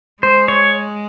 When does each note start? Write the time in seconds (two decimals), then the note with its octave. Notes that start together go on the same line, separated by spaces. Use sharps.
0.22 G#3 C5
0.48 C#5